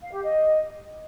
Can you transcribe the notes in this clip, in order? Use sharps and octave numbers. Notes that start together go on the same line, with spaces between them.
F5
G4
D#5